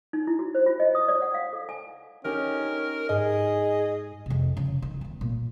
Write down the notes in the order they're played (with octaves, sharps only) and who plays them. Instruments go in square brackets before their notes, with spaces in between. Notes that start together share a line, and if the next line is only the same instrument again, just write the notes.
[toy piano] D#4
E4
F#4
C5
F4
D#5
D#6
D5
F#5
F5
A4
G#5
[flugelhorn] C#4 [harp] D#4 G4 [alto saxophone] A#4
[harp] G#2 [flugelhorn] G#4 [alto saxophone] D#5
[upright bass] F2 C3
C#3
D#3
D#3 B3
A#2